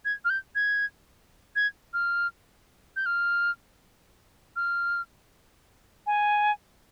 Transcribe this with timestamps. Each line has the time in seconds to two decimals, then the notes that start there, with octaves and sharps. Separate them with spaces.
0.05 G#6
0.25 F6
0.30 G6
0.55 G#6
1.56 G#6
1.93 F6
2.96 G6
3.06 F6
4.56 F6
6.07 G#5